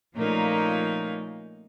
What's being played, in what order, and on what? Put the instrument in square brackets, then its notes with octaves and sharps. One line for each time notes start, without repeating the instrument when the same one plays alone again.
[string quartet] A#2 F3 A3 A#3 C#4 D#4